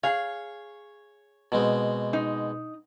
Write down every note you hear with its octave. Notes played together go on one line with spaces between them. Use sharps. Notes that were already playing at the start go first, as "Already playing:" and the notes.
G#4 C#5 F5
B2 G#3 C4
D#4